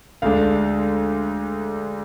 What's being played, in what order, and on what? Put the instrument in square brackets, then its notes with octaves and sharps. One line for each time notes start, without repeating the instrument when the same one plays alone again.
[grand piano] D2 D3 G#3 D4 F5